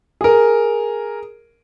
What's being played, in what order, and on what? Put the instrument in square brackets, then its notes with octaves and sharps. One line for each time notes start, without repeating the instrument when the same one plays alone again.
[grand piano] G#4 A#4